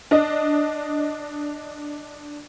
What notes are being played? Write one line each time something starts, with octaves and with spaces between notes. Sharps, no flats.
D4 D#5